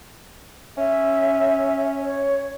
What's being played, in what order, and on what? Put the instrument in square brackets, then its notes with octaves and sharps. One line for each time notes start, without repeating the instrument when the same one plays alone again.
[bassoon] C#4 [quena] E5
[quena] C#5